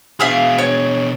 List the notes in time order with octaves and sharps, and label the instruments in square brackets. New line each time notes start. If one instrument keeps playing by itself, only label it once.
[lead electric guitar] B2 G#4 [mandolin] E5 F5 D#6
[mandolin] C#5